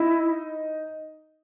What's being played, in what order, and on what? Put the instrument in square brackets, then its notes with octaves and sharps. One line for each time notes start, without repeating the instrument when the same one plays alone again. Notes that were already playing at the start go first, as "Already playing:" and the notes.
Already playing: [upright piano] D#4 D#5 [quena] E4